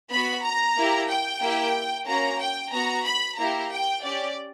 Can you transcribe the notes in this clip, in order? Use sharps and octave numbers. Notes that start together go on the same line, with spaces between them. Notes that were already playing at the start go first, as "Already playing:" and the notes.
B3 F#4 B5
A#5
A#3 E4 G4
G5
A#3 E4 G4
A#3 C#4 F#4 A#5
G5
B3 F#4 A#5
B5
A#3 E4 G4 A#5
G5
C#4 G4 D5